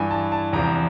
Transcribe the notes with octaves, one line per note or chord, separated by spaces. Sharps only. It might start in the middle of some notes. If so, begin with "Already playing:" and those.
Already playing: G2 E3 G#5
A5
A5
E2 C3 F3 A#5